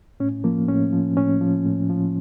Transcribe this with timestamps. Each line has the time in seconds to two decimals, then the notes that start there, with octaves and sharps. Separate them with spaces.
0.20 A2 C#4
0.44 F3 A#3
0.68 A2 C#4
0.93 F3
1.17 A2 C#4
1.41 F3
1.66 A2
1.90 F3